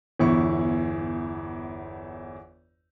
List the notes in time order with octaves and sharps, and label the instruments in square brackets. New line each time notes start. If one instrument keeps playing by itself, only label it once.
[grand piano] G1 E2 E4 C#6